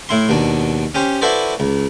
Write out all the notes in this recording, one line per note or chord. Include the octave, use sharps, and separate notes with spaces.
A2 E4 C6
D#2 B2 D4
C#4 G4 C5
E4 F#4 A4 B4 C5 D5
C#2